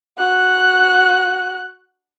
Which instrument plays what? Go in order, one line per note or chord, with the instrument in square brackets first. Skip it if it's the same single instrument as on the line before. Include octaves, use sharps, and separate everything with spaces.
[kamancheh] F#4 F#6